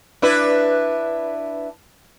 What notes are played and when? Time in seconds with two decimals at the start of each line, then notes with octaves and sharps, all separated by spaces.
0.22 D4 E4 B4